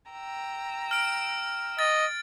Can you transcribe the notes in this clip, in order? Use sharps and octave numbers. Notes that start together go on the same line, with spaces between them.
G5 A#5 E6
F6 D7
D#5 A6